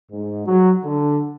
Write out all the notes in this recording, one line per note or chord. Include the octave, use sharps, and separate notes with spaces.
G#2
F#3
D3